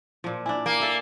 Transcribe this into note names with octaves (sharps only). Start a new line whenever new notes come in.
A#2 F3
D4 E4 G#5
A#3
A4 E5 F5